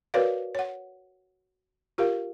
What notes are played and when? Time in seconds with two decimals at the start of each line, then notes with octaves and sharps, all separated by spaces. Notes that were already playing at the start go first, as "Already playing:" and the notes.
0.14 F#4 A#4 B4 C#5 D5 F5
0.55 C#5 F#5
1.98 F4 G4 A#4 F5